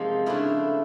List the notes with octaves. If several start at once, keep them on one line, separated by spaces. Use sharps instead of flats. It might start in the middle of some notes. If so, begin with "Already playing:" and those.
Already playing: C3 F3 G#3 A#3 C4 D#4
C#3 F3 A3 D4 E4